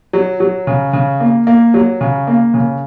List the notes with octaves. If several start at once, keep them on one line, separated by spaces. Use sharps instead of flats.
F#3
F#3
C#3
C#3
A#3
A#3
F#3
C#3
A#3
C#3